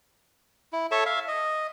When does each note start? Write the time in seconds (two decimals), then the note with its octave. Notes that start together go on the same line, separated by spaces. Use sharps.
0.73 E4
0.91 A4 C#5 E5 A5
1.06 E5 F5
1.28 D#5